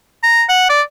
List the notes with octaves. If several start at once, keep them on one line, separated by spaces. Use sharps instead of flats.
A#5
F#5
D5